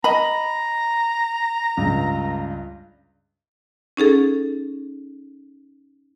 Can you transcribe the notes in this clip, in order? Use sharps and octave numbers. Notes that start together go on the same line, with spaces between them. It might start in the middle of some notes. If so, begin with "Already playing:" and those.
D#5 A#5 B5
C#2 G2
C#4 D#4 G#4 A4